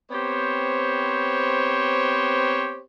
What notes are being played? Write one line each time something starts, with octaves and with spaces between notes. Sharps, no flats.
B3 C4 G4 C5 C#5